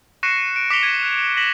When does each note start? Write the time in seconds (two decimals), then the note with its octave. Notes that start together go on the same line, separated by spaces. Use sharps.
0.23 C#6 F#6 A#6 C7 C#7 E7
0.56 D7
0.70 D6 B6 C#7 D7 F7 G7
0.83 G#6 D#7
1.03 F#6
1.37 A#6 B6 E7 F#7